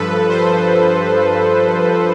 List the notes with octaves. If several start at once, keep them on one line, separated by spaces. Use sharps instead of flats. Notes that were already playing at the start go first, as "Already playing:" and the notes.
Already playing: G2 F3 A4 B4
C5